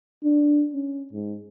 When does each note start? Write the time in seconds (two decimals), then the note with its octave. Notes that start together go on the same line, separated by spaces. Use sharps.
0.24 D4
0.74 C#4
1.13 G#2